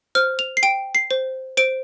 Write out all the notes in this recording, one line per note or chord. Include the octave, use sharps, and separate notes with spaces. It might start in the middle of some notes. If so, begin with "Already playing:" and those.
C5 F6
F7
C7
G5 D7
C7
C5
C5 D7